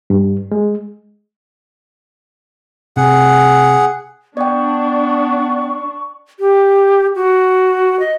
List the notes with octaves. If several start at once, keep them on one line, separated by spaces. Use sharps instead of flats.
G2
G#3
C3 G#4 F#5
B3 D4 D5 G5 C#6
G4
F#4
D#5